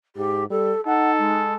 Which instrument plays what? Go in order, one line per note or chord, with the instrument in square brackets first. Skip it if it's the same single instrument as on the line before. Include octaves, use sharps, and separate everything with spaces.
[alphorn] G#2 [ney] G4
[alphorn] G3 [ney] A4
[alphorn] D#4 [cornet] A4 [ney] F#5
[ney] G#3